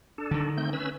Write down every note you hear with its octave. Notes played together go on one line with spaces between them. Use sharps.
D4 A4
D3 D#3
A3 C4 G6
C#4 B4 E6